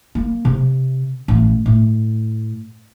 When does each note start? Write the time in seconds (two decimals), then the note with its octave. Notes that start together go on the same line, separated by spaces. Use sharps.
0.15 A#3
0.45 C3
1.28 A1
1.66 A2